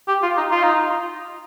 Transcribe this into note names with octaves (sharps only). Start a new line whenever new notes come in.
G4
F4
D#4
F4
D#4